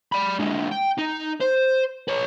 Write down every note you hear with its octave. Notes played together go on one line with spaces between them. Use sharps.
D5 B5
D3 G#3
G5
D#4
C5
B4 C#5